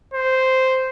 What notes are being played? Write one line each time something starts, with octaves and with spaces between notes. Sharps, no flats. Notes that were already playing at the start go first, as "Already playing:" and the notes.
C5